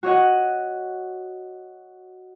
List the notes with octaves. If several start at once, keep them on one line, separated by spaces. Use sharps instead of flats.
F#4 C#5 D#5 F#5